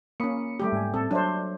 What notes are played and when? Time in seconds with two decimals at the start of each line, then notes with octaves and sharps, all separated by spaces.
0.20 A#3 C#4 B5 D#6 C#7
0.60 G3 A3 G4
0.73 G#2 G5 G#5
0.94 A2 C4 A4
1.11 F#3 D4 C5 C#5 E5